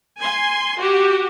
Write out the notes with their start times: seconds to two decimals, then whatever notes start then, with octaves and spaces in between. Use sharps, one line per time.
0.20 G#5 C6
0.78 F#4 G4